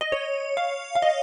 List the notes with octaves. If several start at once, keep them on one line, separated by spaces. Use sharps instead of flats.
D#5
C#5
F5
F5
D#5